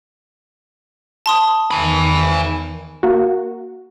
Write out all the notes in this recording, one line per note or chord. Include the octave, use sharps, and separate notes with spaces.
A5 C6 D#6
E2 D#3 G#5 B5
A#3 F#4